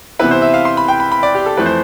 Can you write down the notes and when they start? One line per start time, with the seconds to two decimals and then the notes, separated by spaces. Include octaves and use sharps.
0.19 C3 E3 B3 E4 B4
0.31 C5
0.42 E5
0.54 F5
0.65 C6
0.77 B5
0.88 G5
1.00 B5
1.12 B5
1.23 D5
1.35 G4
1.46 A4
1.57 F2 E3 A3 C4 B4
1.66 C5